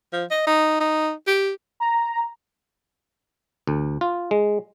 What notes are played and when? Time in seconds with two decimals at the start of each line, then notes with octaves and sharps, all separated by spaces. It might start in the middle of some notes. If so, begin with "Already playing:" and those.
0.13 F3
0.30 D#5
0.46 D#4
0.80 D#4
1.27 G4
1.80 A#5
3.67 D2
4.01 F4
4.31 G#3